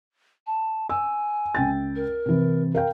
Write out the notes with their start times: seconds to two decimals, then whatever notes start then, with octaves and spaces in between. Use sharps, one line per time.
0.47 A5
0.89 G#5 E6
1.55 C#2 G5 A6
1.96 A#4
2.26 C3 E3
2.75 A#4 F5 G5